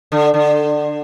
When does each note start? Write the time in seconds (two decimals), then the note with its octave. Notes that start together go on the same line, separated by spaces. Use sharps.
0.12 D3
0.34 D3